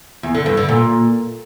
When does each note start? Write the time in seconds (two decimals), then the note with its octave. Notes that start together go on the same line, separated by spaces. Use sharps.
0.23 E2
0.35 D3
0.46 G2
0.57 D3
0.69 A#2